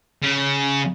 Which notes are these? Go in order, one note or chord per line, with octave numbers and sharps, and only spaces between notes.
C#3